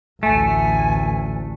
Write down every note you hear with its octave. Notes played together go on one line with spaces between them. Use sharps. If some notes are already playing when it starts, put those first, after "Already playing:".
A1 D2 A3 G#5